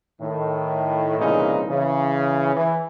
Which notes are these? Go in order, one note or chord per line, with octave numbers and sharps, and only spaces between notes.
A2 D#3
C2 A#2 C#3 E3 D#4 G#4
C#3 E3
E3